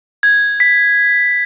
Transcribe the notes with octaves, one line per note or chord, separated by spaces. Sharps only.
G#6
B6